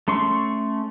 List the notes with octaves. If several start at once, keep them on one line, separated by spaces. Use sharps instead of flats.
A3 C#4 C6 C#6